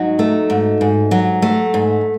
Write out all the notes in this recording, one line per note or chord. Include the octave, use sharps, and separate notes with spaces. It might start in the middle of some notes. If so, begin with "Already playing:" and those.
Already playing: G#2 F#3 D#4 F#4
A3
G#2
G#2
F#3
A3
G#2